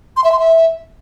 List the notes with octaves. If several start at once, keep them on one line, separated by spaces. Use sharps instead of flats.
C6
E5
C6
E5